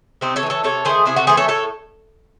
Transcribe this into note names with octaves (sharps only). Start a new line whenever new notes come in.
C3 C4 D#4
A4 C#5
E3 A3
A4 C#5
C3 A4 C#5
D#3 A3 G#4 C5
C3 E4 G#4
F#4 A4
E3 A3 G#4 C5
A4 C#5
A2 A4 C#5